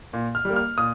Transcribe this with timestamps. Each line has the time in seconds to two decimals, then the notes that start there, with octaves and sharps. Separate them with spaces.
0.13 A#2
0.35 F6
0.45 G3 A#3
0.56 F6
0.77 A#2 D#6